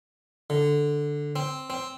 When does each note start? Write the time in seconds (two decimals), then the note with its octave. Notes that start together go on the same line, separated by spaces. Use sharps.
0.50 D3
1.36 C4
1.70 C4